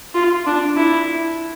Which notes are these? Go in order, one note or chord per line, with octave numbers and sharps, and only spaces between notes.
F4
D4
E4